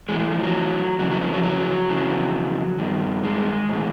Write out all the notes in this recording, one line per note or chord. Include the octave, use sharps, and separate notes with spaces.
A2 E3 G#3
A3
F3
F#3
F2 C#3 E3 F#3
F#3
F3
F#3
F#3
F2 C#3 E3
G2 D#3
G#3
A2 E3